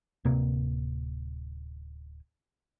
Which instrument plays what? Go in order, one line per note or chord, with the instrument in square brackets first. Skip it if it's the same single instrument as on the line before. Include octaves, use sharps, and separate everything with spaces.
[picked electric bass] D1 C3 A#3